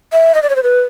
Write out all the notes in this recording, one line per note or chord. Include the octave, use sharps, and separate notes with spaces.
E5
D#5
D5
C#5
C5
B4